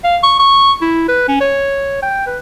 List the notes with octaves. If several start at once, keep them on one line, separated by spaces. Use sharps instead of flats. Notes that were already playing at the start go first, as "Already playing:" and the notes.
F5
C#6
C#6
E4
B4
C#4
C#5
G5
B4